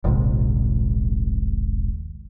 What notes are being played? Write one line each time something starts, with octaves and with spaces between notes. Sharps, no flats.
D#1 A#1 G#2 C3